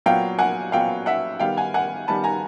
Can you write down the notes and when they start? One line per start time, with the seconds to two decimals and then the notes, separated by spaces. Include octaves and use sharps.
0.06 A#2 F#3 B3 F5 G5
0.39 F#5 G#5
0.72 A#2 F#3 B3 F5 G5
1.06 E5 F#5
1.39 D#3 G3 B3 F5 G5
1.57 F#5 G#5
1.74 F#5 G#5
2.08 D#3 G3 B3 A5 B5
2.24 G#5 A#5